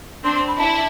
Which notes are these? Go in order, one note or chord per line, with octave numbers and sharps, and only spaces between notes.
C4 D4 C6
C6
B5
D4 E4 A5